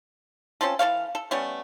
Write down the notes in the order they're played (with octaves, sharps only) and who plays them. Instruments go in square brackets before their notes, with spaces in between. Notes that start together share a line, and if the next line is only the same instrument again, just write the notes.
[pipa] C4 C#4 F4 A4
E3 A4 C#5 F5
A4
G3 A3 B3 C#4